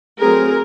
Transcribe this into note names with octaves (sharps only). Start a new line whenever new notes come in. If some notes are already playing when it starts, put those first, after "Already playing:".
F#3 A3 C4 G#4 A#4